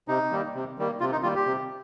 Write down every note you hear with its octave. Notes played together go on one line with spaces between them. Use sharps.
C3 D#4
D#3 G3 A#3
C3
D#3 G3 A#3
C3 F4
D#4
D#3 G3 A#3 F4
G4
C3